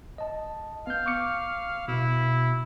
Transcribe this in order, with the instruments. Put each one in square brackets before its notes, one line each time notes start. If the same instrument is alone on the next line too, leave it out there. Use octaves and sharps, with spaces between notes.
[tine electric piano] D#5 A5
[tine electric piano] B3 G6 [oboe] F5
[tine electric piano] C#6 D6 C#7
[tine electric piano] B2 [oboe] E4